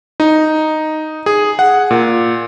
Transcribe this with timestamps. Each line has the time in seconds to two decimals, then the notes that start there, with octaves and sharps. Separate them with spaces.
0.20 D#4
1.26 G#4
1.59 F#5
1.91 A#2